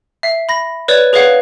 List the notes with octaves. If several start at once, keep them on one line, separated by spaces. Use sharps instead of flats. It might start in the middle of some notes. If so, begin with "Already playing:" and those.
E5 C7
B5 A#6
B4 C#5 D5
G#4 B4 C#5 F5 F#5